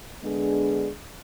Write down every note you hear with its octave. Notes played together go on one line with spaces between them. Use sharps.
D3 G#3 B3 D4 G#4